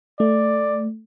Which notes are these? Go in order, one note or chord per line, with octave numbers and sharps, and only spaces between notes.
A3 D5